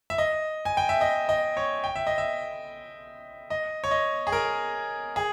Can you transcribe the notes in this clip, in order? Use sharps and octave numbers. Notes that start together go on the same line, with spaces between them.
E5
D#5
G#5
G5
E5
D#5
D#5
C#5
G5
E5
D#5
E5
D#5
C#5
D#5
G#4
A#4
G#4